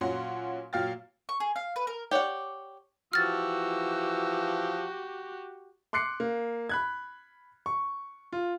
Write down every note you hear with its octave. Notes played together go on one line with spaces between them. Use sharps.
A#2 F#3 C#4 F#5 C6
A#2 F#3 F5 G5 F6 A6
C#6
G#4
F5
B4
A#4
G4 C#5 D5 F#5
E3 F3 F#4 G4 E6 F6 A6
C6 D6 F#6 C7 C#7
A#3
B5 F#6 G#6
C#6
F4